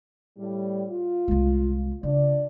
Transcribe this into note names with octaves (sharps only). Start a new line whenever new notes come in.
A2 G3
F4
C2 G#3
C#3 D4 F4 D5